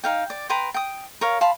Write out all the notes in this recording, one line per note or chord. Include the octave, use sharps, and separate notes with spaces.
D#4 F5 G5
D5
B4 G5 A#5 C6
G5 D#6
A#4 C#5 F5
F5 A5 B5 C6